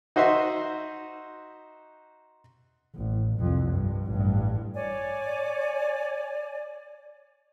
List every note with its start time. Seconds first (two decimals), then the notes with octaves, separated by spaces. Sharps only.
0.16 D#4 F#4 C5 E5 C6
2.96 A1
3.39 C2 F2
3.72 G2
4.06 A1 G2
4.74 C#5 D5 G#5